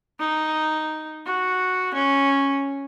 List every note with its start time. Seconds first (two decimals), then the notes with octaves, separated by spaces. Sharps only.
0.19 D#4
1.26 F#4
1.94 C#4